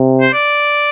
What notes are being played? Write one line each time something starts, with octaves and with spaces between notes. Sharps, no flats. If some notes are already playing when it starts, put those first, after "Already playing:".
Already playing: C3
C5
D5